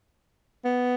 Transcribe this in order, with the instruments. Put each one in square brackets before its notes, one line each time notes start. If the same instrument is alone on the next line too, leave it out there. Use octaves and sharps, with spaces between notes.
[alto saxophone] B3